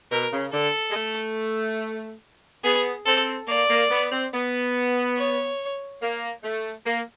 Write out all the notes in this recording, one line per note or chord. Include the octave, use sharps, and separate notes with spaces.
B2 A#4
C#3
D3 A4
G#3
A3
B3 G#4
C4 A4
A#3 D5
A#3
B3
C4
B3
C#5
A#3
A3
A#3